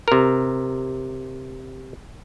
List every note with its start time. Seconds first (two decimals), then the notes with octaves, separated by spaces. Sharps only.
0.08 C3 A#4